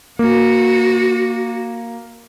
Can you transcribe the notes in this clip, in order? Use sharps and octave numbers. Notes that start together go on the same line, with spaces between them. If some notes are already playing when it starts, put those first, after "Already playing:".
A#3 F#4